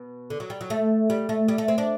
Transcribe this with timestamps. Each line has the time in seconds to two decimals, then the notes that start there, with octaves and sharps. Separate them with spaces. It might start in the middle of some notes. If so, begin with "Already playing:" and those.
Already playing: B2
0.30 D3
0.40 F#3
0.50 G3
0.61 F#3
0.70 A3
1.10 G3
1.29 A3
1.48 G3
1.58 A3
1.68 C4
1.78 D4